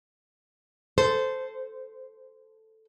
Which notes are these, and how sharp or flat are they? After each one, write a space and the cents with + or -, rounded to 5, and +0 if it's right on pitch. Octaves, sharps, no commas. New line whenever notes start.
A4 +0 C5 -10